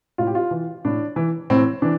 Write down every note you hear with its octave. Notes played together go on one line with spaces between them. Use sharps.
A2 F4
G4
F4
E3
A2 D4
E3
A2 C4
E3 D4